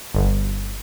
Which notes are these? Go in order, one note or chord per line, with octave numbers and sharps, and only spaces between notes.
G1